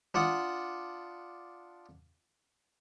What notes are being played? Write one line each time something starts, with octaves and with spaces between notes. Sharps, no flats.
D4 F4 F#5 D#6